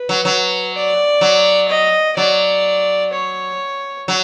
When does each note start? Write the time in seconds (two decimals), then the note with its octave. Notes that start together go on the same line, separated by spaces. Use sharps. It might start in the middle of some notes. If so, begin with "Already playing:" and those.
Already playing: B4
0.09 F#3
0.25 F#3
0.73 D5
1.21 F#3
1.69 D#5
2.17 F#3 D5
3.13 C#5
4.08 F#3